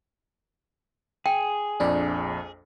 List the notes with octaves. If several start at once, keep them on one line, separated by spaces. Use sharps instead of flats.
G#4 G5
A#1 F2 D4 D5